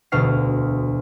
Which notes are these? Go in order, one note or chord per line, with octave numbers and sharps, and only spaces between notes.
E1 D2 B2 F5 F6 C7